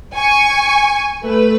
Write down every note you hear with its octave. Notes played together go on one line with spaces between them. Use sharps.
G#5 C#6
A3 B4